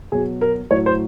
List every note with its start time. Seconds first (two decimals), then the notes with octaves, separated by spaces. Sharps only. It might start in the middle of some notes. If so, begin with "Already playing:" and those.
0.12 B2 F#3 G#4
0.41 A#4
0.71 A2 F#3 C#5
0.86 C5